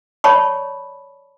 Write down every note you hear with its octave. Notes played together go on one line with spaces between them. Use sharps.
C#5 D5 A5 B5 C#6